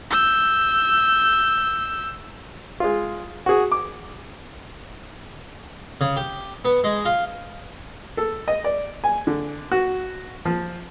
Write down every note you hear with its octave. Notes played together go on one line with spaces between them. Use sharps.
E6 G6
G#3 F4
F#4 G#4
D6
C#3
G4
B3
G#3
F4
A4
D#5
D5
G#5
D3
F#4
F3